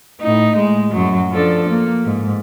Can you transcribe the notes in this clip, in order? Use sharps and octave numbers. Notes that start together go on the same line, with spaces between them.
A2 D#4
G#3
F#2 F#3
F3 D4 A4
A#3
G#2